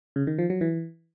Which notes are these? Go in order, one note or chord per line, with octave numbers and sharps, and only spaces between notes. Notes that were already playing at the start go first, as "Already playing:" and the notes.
C#3
D#3
F3
F#3
E3